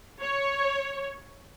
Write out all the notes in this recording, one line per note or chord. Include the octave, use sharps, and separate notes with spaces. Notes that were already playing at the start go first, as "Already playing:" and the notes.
C#5